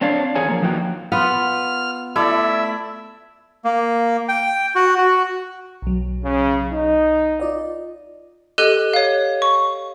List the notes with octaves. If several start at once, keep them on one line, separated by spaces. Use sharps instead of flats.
C4 D4 C#5 F5
E2 D#3 G#4 C#5 G#5
F3 A#3
E2 F3 D#4 F#4 G5
B3 F4 B4 F6
A3 E4 D5 E5
A#3
G5
F#4
F#4
B1 F#3
C#3
D#4
F4 D5 D#5
G4 A4 D#5 F#6 D#7 G7
C#5 F5
C#6